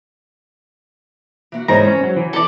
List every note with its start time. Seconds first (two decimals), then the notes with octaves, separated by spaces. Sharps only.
1.52 E3 A#3 F#4
1.68 G#2 E3 G#3 A#4 C5 C#5 A#5
1.87 C#4
2.03 F#3
2.16 E3
2.33 C#4 E4 A4 D5